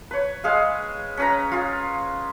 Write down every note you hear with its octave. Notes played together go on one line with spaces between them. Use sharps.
B4 C#5
G#3 G#4 F5
C#4 B4 A#5
F4 G#4